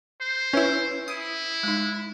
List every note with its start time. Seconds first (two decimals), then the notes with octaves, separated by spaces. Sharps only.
0.21 C5
0.53 C#4 E4 B4 E5
1.08 E4 D#6
1.63 G#3 D#4